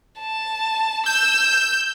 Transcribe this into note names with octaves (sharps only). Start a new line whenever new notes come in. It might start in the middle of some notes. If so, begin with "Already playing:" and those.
A5
E6 G6